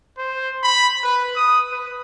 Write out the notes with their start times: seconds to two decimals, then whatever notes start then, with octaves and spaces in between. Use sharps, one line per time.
0.18 C5
0.63 B5
1.03 B4
1.36 D#6
1.72 B4